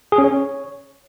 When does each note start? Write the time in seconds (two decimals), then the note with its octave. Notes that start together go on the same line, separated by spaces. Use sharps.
0.12 G#4
0.18 C#4
0.24 C#5